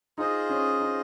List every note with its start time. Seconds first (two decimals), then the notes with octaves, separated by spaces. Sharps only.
0.18 D#4 F4 G#4 C5 D#5
0.50 C#4
0.80 D#4